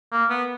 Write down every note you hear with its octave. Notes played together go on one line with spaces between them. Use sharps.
A#3
B3